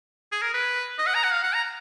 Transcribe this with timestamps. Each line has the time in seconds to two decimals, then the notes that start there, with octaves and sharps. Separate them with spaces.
0.32 G#4
0.42 A#4
0.54 B4
0.99 D#5
1.06 F#5
1.15 A#5
1.24 F#5
1.31 F5
1.43 F#5
1.54 A#5